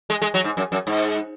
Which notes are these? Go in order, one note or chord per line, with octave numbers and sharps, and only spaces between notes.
G#3
G#3
F#3
G#2
F#2
F#2
G#2